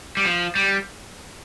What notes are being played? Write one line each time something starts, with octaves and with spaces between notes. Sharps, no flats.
G3
F3
G3